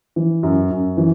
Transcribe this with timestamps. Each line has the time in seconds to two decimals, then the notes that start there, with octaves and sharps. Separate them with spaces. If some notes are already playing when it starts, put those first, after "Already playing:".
0.16 E3
0.43 F#2
0.71 F#2
0.97 E3